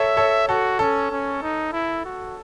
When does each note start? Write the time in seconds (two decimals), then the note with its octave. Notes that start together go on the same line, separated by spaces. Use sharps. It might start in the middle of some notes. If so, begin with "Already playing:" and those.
Already playing: A4 C#5 E5
0.17 A4 C#5
0.48 F#4 A4
0.79 C#4 A4
1.11 C#4
1.42 D#4
1.73 E4
2.05 F#4